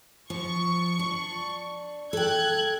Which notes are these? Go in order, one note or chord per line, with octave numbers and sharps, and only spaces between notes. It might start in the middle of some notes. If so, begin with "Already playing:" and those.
F3 C#6
D4
A4 G5 F#6 G#6